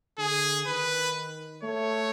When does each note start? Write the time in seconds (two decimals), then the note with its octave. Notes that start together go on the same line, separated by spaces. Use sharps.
0.18 D3 G#4
0.66 D#3 B4
1.63 A3 C#5